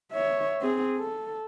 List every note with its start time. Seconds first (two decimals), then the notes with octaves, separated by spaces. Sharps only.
0.12 C#5 E5
0.61 C4 G#4
0.97 A4